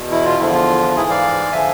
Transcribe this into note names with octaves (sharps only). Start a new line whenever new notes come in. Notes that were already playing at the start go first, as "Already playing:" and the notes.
Already playing: E2 B2
E4
F4
E2 D3 F3 E4
F4
G#2 E3 E4 G#4
D5 F5
D3 F3 E5 G#5